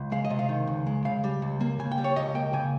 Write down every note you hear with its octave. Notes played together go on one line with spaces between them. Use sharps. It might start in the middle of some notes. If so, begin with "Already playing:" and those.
Already playing: C#2
G#3 F5
D#5
C3
F5
D#3
C#2
G#3
C#3 F5
G3
C#2
A#3
C#3 G#5
G5
G3
C#5
C#2 D#5
A#3 G5
C#3 G#5